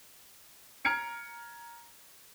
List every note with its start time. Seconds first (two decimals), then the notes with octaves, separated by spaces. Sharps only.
0.85 A#5 F6 G#6 C#7 D7